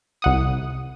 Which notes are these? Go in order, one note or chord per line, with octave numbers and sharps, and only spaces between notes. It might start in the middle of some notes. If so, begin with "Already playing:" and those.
C2 F#5 D#6